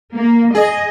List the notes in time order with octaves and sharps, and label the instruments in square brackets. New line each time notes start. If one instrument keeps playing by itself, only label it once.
[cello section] A#3
[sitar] G#4 [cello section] D#5